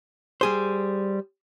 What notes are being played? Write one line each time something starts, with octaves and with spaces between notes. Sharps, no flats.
G3 G#4 C5